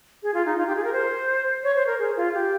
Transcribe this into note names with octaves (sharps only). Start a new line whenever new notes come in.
G#4
F4
D#4
F4
G4
G#4
A#4
C5
C#5
C5
A#4
G#4
F4
G4